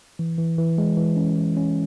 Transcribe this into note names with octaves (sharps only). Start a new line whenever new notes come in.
E3
E3
E3
G#3
E3
C#4
E3
C#4